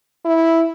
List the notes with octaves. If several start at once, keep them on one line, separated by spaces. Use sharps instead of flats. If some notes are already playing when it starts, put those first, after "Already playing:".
E4